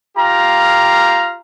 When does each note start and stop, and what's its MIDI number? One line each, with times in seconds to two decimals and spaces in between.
0.17 1.39 65
0.17 1.39 67
0.17 1.39 77
0.17 1.39 82